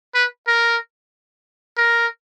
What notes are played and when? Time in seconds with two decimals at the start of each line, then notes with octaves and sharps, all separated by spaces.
0.15 B4
0.48 A#4
1.78 A#4